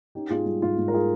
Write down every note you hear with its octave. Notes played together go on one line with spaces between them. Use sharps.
C#4 D#4 G4
G#2 F4 G#4
G3 F4
G#2 F4
G#2
A#4
F4 G#4